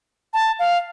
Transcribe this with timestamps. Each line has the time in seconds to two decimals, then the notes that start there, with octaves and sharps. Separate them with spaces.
0.34 A5
0.59 F5